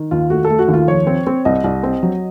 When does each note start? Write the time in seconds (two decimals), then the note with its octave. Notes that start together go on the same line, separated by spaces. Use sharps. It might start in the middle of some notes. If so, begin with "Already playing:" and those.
Already playing: D#3
0.11 D#2 F4
0.30 A3 F#4
0.45 A4
0.50 A3
0.59 F#4
0.68 D#2
0.73 F4
0.87 F3 C#5
1.07 C4
1.27 C4
1.45 C2 D#5
1.64 C2
1.83 C4
2.03 F#3